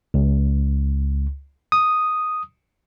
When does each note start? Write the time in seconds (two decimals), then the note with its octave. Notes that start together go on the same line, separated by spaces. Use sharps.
0.14 C#2
1.72 D#6